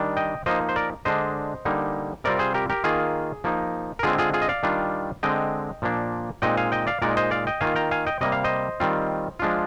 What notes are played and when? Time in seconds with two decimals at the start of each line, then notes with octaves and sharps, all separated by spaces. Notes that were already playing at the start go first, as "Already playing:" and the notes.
Already playing: D#3 G3 D4
0.17 D#5 G5
0.46 F3 A#3 D#4 C5 D#5
0.69 C5
0.76 A#4 D5
1.05 D3 G#3 D4 C5 D#5
1.65 D3 G3 A#3 D#4
2.24 C3 G3 C4 F4 A#4 D5
2.39 G#4 C5
2.54 G4 A#4
2.70 G4 A#4
2.84 D#3 A#3 F4 G#4
3.44 F3 A#3 D#4
3.99 A#4
4.03 D3 G#3 C4 F4 G#4
4.18 F4 G#4
4.33 F4 G#4
4.42 D#5
4.49 D5 F5
4.63 D#3 G3 D4 F4
5.23 D3 G#3 C4 D#5 G5
5.82 A#2 F3 A#3 D4
6.42 A#2 G#3 C4 D#4 D#5 G5
6.57 F5 G#5
6.72 D#5 G5
6.87 D5 F5
7.02 A#2 G#3 D#4 A#4 D5
7.17 C5 D#5
7.31 D5 F5
7.47 D#5 G5
7.61 D#3 A#3 F4 F5 G#5
7.76 G5 A#5
7.91 F5 G#5
8.07 D#5 G5
8.21 C3 G3 A#3 D#5
8.32 F5
8.44 C5 D#5
8.80 D#3 G3 C4 F4
9.39 F3 G#3 D4 F4